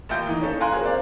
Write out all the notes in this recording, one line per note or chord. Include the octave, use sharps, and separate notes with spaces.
A1 A#3 F4 E5 G5 G6
E3 D#4
C#4 A4
F5 G5 G#5 A#5 C6 F#6
F3 F#3 A#3 F4 G#4 A#4
C4 D5 F5